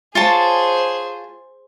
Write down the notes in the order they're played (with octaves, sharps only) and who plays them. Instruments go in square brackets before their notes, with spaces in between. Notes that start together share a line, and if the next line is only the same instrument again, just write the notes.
[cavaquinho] F4 C#5 A5 [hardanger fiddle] G#4 C5